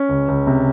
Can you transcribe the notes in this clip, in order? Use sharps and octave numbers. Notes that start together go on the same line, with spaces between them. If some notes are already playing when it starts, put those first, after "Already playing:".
Already playing: C#4
C#2
C#2
C3